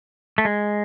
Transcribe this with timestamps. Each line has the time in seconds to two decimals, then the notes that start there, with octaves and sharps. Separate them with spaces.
0.38 A3
0.45 G#3